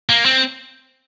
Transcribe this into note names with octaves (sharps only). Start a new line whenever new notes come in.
A#3
C4